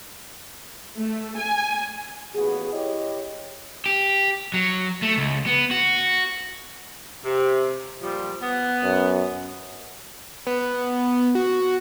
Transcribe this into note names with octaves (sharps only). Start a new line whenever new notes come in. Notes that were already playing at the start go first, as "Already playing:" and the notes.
A3
G#5
A1 D#2 B3 F#4 G#4
E4 G4 C#5 D#5
G4
F#3
A3
C#2
B3
F#4
C3
A#2 F3 G3
B3
F#2
B3
F#4